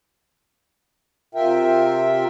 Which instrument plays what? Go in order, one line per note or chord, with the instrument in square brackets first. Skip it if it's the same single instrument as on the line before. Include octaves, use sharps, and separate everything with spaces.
[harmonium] C3 F4 A#4 E5 G5